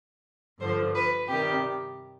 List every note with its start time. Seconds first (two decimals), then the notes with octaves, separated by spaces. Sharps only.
0.59 G2 D3 F3 C5
0.95 B4
1.28 C3 D#3 G3 G4